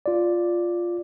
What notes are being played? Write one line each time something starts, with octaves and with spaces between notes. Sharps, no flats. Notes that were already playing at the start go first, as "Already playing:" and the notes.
F4 D5